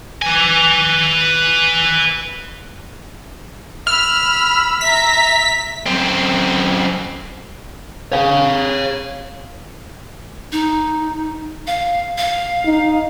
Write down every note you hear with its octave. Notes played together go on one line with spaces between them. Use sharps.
B4 G#5
B5 E6 F6
E5 A#5 B6
F#2 C4
C#5 F5
D#4
F5
F5
D#4